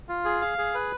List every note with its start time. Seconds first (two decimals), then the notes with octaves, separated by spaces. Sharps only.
0.09 F4
0.25 G#4
0.42 F5
0.58 G#4
0.75 B4